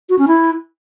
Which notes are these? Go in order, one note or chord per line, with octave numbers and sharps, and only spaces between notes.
F#4
C#4
E4